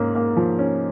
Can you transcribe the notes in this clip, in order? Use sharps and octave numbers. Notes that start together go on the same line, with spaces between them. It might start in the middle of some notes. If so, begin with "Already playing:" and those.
Already playing: G#2 A#3 C#4
A#3
F3
C#4